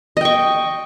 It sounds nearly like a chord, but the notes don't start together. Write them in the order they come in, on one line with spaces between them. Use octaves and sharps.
D#5 G5 C#6